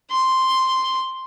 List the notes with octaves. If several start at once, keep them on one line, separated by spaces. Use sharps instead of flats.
C6